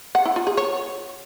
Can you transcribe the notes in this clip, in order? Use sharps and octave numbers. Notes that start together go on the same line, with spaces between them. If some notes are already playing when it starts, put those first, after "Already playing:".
F#5
E4
F4
G#4
C#5